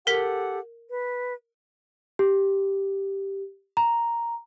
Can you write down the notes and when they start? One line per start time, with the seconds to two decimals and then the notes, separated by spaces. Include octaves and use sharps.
0.07 G4 A4 A#4 F#5 B6
0.89 B4
2.19 G4
3.77 A#5